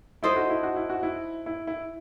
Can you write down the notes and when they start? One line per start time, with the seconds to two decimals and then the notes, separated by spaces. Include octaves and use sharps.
0.23 D#4 E4 A4 C5 D#5
0.36 F#4
0.50 E4
0.63 F#4
0.76 E4
0.89 F#4
1.03 E4
1.46 E4
1.67 E4